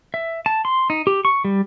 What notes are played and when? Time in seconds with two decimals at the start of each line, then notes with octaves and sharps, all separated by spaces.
0.14 E5
0.46 A5
0.65 C6
0.90 D#4
1.07 G4
1.25 C#6
1.45 G3